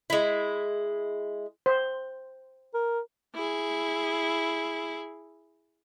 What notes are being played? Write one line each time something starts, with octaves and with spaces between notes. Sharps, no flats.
G#3 E4
C5
A#4
E4 G#4